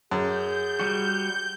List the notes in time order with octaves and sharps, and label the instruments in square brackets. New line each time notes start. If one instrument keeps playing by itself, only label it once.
[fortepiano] F#2 [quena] G#4 [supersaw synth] G6
[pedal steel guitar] G3 F#4